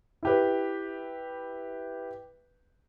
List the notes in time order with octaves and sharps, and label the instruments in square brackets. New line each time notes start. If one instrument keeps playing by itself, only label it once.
[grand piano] E4 G4 B4